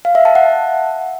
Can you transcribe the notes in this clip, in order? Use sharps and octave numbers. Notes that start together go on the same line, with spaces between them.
F5
E5
A5
F#5